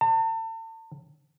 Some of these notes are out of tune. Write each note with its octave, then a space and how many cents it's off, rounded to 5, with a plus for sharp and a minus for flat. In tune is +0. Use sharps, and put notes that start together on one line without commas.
A5 +40